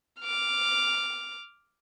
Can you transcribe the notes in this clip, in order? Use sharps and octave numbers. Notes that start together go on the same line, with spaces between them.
D6 F6